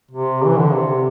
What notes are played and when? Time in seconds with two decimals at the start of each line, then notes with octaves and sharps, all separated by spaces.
0.11 C3
0.47 E3
0.59 D3
0.73 C3